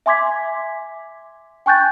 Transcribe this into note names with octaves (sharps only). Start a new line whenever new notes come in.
E5 G#5 C6 D6 G#6 B6
G5 G#5 C#6 F#6 G6 A6